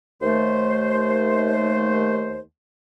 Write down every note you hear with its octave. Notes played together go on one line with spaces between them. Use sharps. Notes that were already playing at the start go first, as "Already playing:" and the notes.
D#2 A3 C5